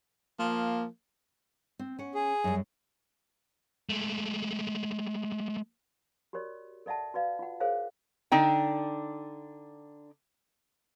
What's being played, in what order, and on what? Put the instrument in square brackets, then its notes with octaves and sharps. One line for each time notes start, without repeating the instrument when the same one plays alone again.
[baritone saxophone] F3 [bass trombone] A#3
[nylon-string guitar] C4
C#4 F#5
[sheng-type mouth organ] G#4
[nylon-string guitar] F#2 G3
[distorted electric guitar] G#3 A3
[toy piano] F#4 G4 A#4 C#5 D5
A4 D5 E5 F#5 A5
F#4 B4 D5 F5
F4 F#5
G#4 A#4 C5 C#5 F5
[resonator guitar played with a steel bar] D3 D4 D#4 G5